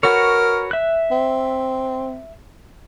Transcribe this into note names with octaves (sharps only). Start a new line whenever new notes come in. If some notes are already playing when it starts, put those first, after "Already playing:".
F#4 A#4 B4 C#5
E5 F#6
C4